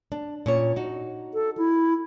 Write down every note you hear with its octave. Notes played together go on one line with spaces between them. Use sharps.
D4
A#2 C#4 C#5
D#4 F#4
A4
E4